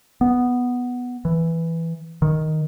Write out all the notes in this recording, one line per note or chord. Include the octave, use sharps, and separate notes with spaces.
B3
E3
D#3